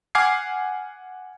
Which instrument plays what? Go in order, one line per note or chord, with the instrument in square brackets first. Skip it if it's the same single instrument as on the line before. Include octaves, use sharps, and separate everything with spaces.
[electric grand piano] F#5 G#5 D6 F6 G#6 C7